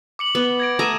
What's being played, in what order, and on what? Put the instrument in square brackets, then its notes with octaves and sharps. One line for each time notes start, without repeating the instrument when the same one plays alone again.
[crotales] D6 C#7 F#7
[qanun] B3
[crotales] G#6 A#6 D7
[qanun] A3 A#5 [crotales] D#6 D#7 E7